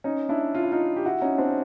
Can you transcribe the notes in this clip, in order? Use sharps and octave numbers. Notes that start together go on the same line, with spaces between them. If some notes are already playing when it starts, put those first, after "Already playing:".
C#4 D#4
D4 E4
F4
E4
D#4 F4
G4
E4 F#4
C#4 D#4
C4 D4